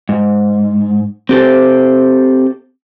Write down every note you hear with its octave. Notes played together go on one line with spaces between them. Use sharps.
G#2
C4 G4 A4 C5